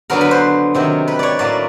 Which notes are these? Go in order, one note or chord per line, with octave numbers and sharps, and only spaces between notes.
D3 F#3 B3 A#4
B4
C5
C3 D#3 F#3
B4
C#5 D5
A2 F#3 A#3 D5